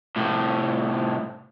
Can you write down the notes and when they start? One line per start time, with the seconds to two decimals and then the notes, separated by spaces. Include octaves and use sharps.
0.16 C2 A2